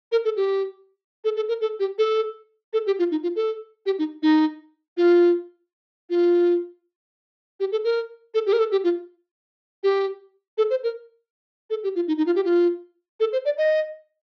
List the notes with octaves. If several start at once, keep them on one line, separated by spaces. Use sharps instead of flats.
A#4
A4
G4
A4
A4
A#4
A4
G4
A4
A4
G4
F4
D#4
F4
A4
G4
D#4
D#4
F4
F4
G4
A4
A#4
A4
G4
A#4
A4
G4
F4
G4
A4
C5
A#4
A4
G4
F4
D#4
D#4
F4
G4
F4
A4
C5
D5
D#5